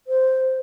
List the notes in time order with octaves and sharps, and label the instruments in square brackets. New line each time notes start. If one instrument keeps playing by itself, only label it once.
[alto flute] C5